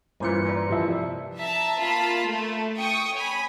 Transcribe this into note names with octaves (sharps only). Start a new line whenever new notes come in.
G2 A#2 E3 C#4 F4 C5 C#7
A#4 B4 D5
C3 F3 E4
E5 A5 A#5
A#3 F4 A5 B5
A3
G5 C#6 D#6
C#5 G#5 B5